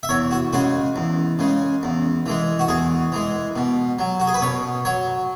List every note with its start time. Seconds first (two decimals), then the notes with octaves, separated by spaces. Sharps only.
0.03 E5
0.09 E2 C#5
0.31 F#4
0.53 C#3 G#3 F#4
0.96 E2
1.39 C#3 G#3
1.83 E2
2.26 E3 G#3
2.59 F#4
2.68 E2 G#4
3.12 E3 G#3
3.56 B2
3.99 F#3
4.20 F#4
4.27 G#4
4.34 B4
4.42 B2 C#5
4.85 F#3 C#5